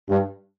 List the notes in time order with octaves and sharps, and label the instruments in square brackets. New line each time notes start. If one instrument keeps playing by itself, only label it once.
[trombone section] G2